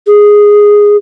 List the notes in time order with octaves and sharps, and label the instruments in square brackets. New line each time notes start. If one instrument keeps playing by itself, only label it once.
[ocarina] G#4